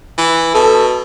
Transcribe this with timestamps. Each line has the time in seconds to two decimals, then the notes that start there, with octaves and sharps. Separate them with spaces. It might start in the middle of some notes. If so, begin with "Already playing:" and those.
0.18 E3
0.54 B2 A4